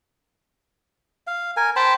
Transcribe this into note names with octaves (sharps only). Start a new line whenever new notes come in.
F5
A#4 G#5
C5 G5 A5 B5